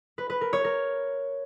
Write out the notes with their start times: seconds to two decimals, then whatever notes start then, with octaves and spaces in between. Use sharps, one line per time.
0.18 B4
0.30 B4
0.41 A#4
0.53 C#5
0.64 A#4